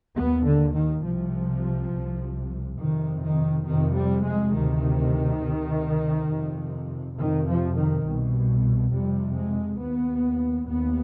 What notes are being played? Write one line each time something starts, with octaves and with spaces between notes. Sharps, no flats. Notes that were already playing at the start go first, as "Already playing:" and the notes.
D#2 B3
D3
D#3
C2 C3 F3
C2 C3
F2 C3 D#3
D#3
F2 C3 D#3
G3
G#3
D2 C3 D#3
D2 C3
F2 C3
F2 C3 D#3
F3
D#3
C2 B2
F2 C3 G3
G#3
D#2 B3
D#2 B3